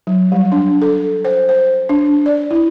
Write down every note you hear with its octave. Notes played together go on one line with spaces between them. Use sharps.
F#3
G3
D4
A4
C5
C5
D4
D5
E4